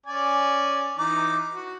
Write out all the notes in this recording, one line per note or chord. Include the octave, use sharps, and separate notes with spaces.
C#4 D5 G#5
E3 D#4 D6
F#4